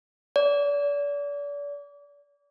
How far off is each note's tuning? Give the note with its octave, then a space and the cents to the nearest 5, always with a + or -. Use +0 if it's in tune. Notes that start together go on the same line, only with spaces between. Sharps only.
D5 -35